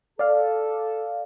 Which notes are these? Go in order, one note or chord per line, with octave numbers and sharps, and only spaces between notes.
A4 D5 F5